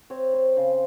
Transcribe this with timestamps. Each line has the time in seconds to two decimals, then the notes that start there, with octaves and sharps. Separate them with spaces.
0.10 C4 C#5
0.34 C5
0.57 C#3 C5